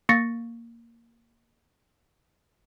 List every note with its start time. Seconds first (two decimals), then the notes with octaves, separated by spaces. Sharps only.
0.09 A#3 C#6 A6 A#6 C#7